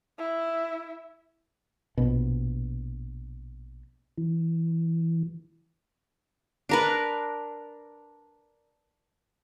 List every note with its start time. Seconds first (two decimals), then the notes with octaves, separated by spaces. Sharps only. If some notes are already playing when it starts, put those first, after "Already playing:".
0.19 E4
1.97 A#1 B2
4.18 E3
6.69 D4 A#4 B4